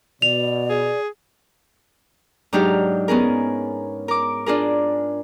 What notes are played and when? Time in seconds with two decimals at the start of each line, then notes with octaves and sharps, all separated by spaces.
0.22 B2 D5 F7
0.70 G#4
2.53 G#2 F#3 D4 D#4 G4 F6
3.08 B3 C#4 G#4 A#4
4.08 A#4 D6
4.46 D4 F4 G#4 A#4